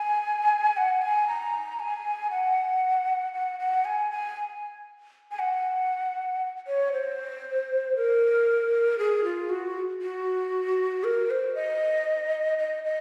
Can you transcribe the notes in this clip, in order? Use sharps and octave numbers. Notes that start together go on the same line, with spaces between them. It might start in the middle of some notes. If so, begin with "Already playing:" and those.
Already playing: G#5
F#5
G#5
A#5
G#5
F#5
F#5
F#5
G#5
G#5
G#5
F#5
C#5
C5
A#4
G#4
F4
F#4
F#4
A#4
C5
D#5
D#5
D#5